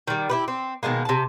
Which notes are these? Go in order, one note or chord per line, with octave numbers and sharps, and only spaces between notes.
D#3 G3
E4 G4 B4
C4
B2 D#3 G#3 A#3
C3 A5